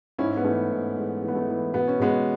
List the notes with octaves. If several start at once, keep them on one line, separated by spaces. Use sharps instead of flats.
G#2 C#4 E4
B3
E3 A3 C#4
G#2
E3 G#3
E3
B3
A3
E3
B2 B3
C#4
B2 G#3 B3